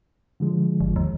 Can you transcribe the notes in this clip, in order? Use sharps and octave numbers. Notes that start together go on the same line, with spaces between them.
D3 F3 G#3
G1
D#2